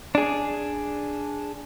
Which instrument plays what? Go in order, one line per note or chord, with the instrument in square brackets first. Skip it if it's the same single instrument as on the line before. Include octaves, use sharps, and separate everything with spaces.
[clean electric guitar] D4 G#4